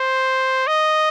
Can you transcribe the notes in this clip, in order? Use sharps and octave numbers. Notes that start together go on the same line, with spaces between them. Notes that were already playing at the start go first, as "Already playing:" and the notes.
Already playing: C5
D#5